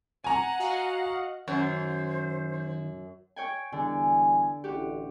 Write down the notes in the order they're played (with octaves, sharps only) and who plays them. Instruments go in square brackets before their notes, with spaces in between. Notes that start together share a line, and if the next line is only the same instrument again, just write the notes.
[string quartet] F#5 [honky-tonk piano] G#5 A#5
[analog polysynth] F#4 D#5 F5
[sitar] F#2 [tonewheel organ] D#3 [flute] C5
[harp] C#5 G5 G#5
[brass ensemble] E2 G3 G#5 [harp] D3
[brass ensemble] A1 [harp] F#4 G4